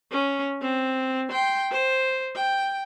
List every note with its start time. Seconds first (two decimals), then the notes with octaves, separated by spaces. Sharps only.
0.11 C#4
0.62 C4
1.30 G5 C6
1.71 C5
2.36 G5